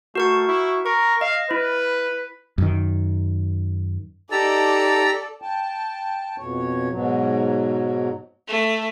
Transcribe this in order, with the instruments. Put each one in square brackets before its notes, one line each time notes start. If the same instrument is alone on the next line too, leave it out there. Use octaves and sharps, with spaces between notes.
[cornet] A3 [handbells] F#4 A#4 C#6
[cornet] E4
[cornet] A#4 [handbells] C#6
[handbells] D#5 [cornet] F5
[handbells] E4 [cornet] B4
[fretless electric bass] F#2 D#3
[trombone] D#4 [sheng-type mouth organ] G4 A#5 E6 [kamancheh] A4 D5 [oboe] A5
[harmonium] G5 A5
F2 B2 C#5
G#2 B2 F#3
[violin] A3